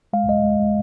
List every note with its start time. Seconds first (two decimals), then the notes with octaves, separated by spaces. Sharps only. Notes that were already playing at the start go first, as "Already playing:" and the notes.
0.13 G#3 F5
0.28 G#3 D#5
0.44 G#3
0.60 G#3